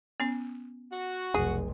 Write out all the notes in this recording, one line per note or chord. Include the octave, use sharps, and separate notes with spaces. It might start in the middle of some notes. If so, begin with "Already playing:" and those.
B3 C#4
F#4
F1 B1 G#4